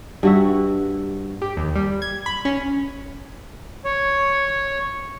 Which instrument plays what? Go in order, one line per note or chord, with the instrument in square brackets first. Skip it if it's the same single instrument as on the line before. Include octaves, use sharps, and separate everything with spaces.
[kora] G2 F#4 E5
[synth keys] G4
D#2
G3
G#6
B5
C#4
[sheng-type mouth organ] C#5